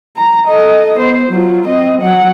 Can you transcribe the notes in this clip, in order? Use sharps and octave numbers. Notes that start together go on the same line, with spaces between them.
A#5
A4 D#5
B3 C5
F#3 F4
C4 D#5
F#3 F#5